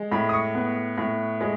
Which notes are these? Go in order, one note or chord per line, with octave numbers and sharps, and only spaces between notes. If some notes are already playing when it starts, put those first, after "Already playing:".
Already playing: G#3
A2 B5
D#6
C#6
B3
A2
G#3